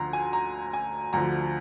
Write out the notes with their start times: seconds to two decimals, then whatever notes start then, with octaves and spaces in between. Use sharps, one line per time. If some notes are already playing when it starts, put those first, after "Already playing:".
Already playing: D2 D3 F3 A#5 C6
0.13 G#5
0.33 A#5
0.73 G#5
1.13 D2 D3 F3 A#5